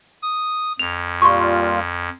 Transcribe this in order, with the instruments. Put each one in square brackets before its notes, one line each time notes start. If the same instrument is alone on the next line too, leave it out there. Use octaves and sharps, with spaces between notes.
[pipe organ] D#6
[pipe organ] F2 [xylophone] F7
[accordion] A#2 G3 F4 [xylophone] C6 C#6